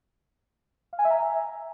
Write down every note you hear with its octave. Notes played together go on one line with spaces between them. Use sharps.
F5
G#5
E5
A#5